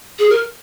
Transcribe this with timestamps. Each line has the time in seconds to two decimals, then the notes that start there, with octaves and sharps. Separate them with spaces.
0.19 G#4
0.29 A#4